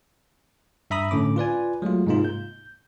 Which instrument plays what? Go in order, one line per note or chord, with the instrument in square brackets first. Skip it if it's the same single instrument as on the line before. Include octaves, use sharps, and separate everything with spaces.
[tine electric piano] G2 E5 A#5 B5 D#6
A2 D3 C#4 D6
F4 B4 D5 G#5
F#3 G#3 A3 F4
G#2 C3 G#3 A#3 D#4 F4
G6